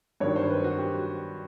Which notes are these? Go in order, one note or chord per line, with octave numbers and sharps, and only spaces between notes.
G2 D#3 F#3 C#5
C5
B4
F#4
G4